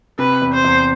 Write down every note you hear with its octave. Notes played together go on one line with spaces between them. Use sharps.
C3 B4
E2
C5
E2